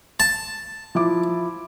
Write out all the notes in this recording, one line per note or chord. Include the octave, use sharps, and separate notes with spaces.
A5
F3 E4 D6